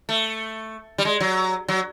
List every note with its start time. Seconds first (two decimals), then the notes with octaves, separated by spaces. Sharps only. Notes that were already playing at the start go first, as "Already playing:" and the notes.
0.09 A3
0.98 G3
1.05 G#3
1.20 F#3
1.68 F#3